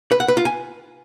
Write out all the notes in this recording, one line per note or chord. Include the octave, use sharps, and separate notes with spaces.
B4
F#5
B4
F4
G#5